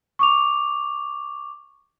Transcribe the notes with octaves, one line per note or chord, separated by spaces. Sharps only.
C#6 D6 F7